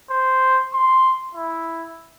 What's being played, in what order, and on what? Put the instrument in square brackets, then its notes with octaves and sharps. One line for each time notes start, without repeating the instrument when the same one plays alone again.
[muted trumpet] C5
C6
E4